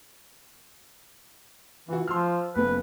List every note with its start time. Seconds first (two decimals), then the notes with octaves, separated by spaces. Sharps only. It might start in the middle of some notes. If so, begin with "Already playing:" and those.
1.88 E3 F4 F#4
2.08 F3 C6 E6 F6
2.56 F#1 B3 A4 B4